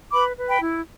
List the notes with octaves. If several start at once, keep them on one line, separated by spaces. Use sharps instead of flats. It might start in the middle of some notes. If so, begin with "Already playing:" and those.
B4 B5 D6
B4
G5 B5
E4